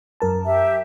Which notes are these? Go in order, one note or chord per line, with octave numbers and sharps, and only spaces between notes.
F#2 A#4 A5
G4 E5